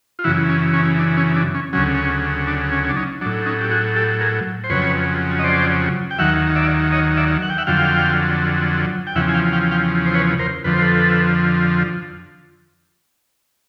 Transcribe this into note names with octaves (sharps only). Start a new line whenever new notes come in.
F4
F#2 C#3 E3 E4 F#4
C#4
C#4
D4
C#4
D4
C#4
D2 C#3 F#3 C#4
C#4
D4
C#4
D4
C#4 D#4
A2 F#3 D4
C#4 D#4
G4
F#4 G#4
G4 A4
G#4 A#4
C5
F2 C#3 F#3 B4 C#5
D#5
C5 D5
G5
D#2 D#3 F#3 E5 F#5
D5 E5
C#5 D#5
D5 E5
F#5
G5
E5 F#5
F2 D3 F#3 F5 G5
G5
E2 C#3 F3 E5 F#5
G#5
F5 G5
F5 G5
F5 G5
C5
B4 C#5
A#4 C5
F2 D3 F3 B4
C5
A4 B4